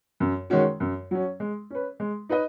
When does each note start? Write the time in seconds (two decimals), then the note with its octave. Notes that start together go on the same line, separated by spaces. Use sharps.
0.20 F#2
0.50 D#3 G#3 C#4 F#4
0.80 F#2
1.11 F#3 C#4
1.40 G#3
1.70 C#4 B4
2.00 G#3
2.29 D#4 B4 D#5